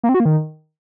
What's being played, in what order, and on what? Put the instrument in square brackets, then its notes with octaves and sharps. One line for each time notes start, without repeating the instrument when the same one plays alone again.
[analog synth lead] A#3
C4
F#4
A#3
D#3